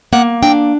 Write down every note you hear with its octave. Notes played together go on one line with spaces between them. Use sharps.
A#3 F#5
D4 G5